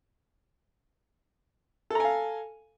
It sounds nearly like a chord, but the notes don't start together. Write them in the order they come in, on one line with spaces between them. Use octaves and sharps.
A4 A#5 G#5 F5